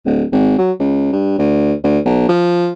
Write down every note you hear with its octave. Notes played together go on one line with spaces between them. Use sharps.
D1
G#1
F#3
C#2
G2
D2
D2
B1
F3